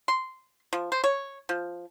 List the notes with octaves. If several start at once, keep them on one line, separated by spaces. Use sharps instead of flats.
C6
F3
C5
C#5
F3